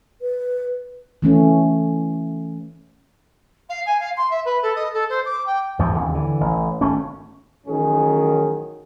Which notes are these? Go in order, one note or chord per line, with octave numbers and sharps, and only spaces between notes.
B4
E3 A3 C#4
F5
G#5
F5
C6
E5
B4
A4
D#5
A4
C5
D6
G5
E2 G#2 C3 F3
D#2 C#3
D3 E3
A1
G#1 A3 C#4
A1 D#3 F#3 C#4 G#4